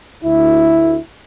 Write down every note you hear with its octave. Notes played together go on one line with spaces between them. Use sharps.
D2 E4